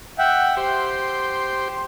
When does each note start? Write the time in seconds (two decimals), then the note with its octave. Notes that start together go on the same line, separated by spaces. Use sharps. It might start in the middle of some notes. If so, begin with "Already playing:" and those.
0.18 E5 F#5 G5
0.57 G4 C5 C6